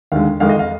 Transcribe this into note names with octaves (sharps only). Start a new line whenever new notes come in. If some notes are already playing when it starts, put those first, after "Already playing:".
D#2 D3 G#3 F5
F2 D#3 G#3 F5
D#5
F5